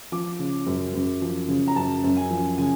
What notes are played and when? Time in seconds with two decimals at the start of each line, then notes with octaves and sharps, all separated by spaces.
0.12 F3 D6
0.39 C#3
0.67 F#2
0.94 F#2
1.22 F3
1.48 C#3
1.67 A#5
1.76 F#2 A5
2.03 F#2
2.17 G#5
2.31 F3
2.58 C#3 G#5